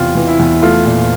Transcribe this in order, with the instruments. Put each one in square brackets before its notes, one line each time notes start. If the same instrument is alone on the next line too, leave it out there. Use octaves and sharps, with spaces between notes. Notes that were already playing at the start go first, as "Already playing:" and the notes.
Already playing: [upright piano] E2 C3 [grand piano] F4 G4
[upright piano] E3
[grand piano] E4
[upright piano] E2
[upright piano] A3 [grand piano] F4
[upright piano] A#2